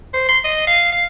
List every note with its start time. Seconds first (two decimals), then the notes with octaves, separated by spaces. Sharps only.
0.13 C5
0.28 C6
0.44 D#5
0.67 F5
0.92 F5